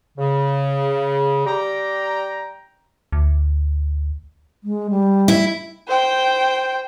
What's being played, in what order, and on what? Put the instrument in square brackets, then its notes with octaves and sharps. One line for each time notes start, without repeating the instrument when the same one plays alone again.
[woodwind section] C#3
G3 G4 G5 A#5
[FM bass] D2
[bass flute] G#3
G3
[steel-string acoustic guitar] E4
[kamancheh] C5 G5